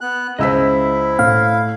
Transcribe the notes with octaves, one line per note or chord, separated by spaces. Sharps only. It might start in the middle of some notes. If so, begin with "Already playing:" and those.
B3 F#6
C#2 E4 C5 D#5 E6 B6
A2 F5